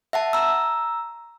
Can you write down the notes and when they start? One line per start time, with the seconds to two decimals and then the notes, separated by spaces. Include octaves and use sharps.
0.13 E5 F#5 A5
0.33 A#5 E6